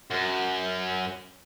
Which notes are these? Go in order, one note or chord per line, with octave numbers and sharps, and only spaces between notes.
F#2